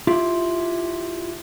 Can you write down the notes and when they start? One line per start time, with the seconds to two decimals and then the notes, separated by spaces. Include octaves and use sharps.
0.07 E4 F4 G4